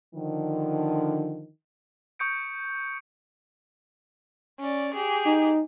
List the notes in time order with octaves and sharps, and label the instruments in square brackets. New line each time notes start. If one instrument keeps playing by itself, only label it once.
[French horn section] D3 D#3 F3
[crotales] C#6 D#6 G6 C#7 D7
[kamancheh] C#4 D5
G4 G#4
[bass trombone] D#4